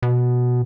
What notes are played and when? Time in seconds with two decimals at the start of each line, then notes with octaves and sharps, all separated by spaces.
0.03 B2